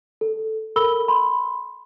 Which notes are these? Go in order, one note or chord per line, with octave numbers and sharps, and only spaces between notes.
A4
A4 A#4 B5 E6 G7
B5 C6